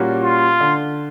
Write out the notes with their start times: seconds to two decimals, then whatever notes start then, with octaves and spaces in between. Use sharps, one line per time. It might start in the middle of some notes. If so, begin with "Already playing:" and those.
Already playing: A#2 G3 A#3 C#4 F#4
0.24 F4
0.60 D3